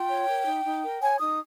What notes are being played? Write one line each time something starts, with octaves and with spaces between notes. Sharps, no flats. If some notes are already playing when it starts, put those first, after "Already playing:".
Already playing: F4 G5
C#5
A#4
D#4
D#4
A#4
C#5 G#5
D#4 D#6